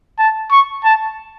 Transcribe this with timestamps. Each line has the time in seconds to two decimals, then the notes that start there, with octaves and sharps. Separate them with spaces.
0.19 A5
0.51 C#6
0.84 A5